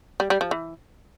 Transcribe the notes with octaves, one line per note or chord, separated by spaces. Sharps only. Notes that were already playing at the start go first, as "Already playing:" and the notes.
G3
G3
F3
E3